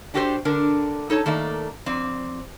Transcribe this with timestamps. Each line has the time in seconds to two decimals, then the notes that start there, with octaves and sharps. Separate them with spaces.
0.14 D4 F#4 G4 A4 B4 C5
0.45 D3 D4 A#4
1.10 D#4 A4 C#5 A5
1.26 D#3 A3 A#3 D5
1.86 F2 C4 D5